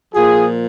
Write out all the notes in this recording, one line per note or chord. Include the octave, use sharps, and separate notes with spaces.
A#2 F3 F4 G#4